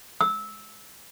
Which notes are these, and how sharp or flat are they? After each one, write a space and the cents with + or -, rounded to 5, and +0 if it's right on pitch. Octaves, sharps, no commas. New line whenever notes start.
E6 -15